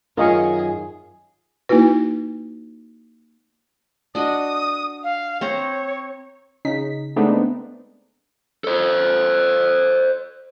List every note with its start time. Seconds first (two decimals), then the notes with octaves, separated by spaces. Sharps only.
0.17 F#2 D#3 F4 G#4 A#4 D#5 C#6
1.69 A#3 D#4 E4 F#4 B4
4.15 D4 F#4 D#5 D#6
5.03 F5
5.41 C4 C5 C#5 A#5
6.65 C#3 D#4 B6
7.16 G#3 A3 B3 C4 D4 D#4
8.64 A4 C5